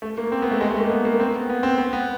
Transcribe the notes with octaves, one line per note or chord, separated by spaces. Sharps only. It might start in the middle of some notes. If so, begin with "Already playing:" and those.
A3
A#3
C4
B3
A3
G#3
A3
A#3
B3
A#3
C4
B3
B3
C4
B3
B3